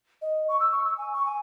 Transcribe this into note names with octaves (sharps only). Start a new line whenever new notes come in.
D#5
C#6
E6
C#6
E6
G#5
C#6
G#5